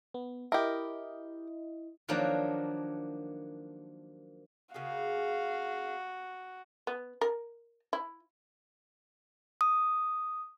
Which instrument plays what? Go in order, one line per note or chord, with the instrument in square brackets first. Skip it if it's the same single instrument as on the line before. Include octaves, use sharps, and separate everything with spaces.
[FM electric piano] B3
[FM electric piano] E4 D#5 [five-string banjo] G4 A#4
[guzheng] D#3 F3 F#3 A#3 D4
[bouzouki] C#3 A#3 G#4 [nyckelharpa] F#4 [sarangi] F5
[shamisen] B3
A#4
E4
[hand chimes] D#6